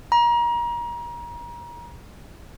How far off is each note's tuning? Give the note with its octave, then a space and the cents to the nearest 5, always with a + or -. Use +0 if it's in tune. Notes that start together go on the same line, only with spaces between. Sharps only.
A#5 +30